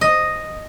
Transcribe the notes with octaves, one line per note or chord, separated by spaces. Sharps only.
D#5